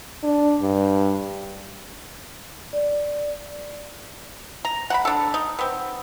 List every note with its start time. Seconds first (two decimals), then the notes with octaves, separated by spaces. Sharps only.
0.23 D4
0.61 G2
2.73 D5
4.65 A#5
4.90 F#5 A#5 B5
5.05 D4 A4
5.34 D#4
5.59 B3 C4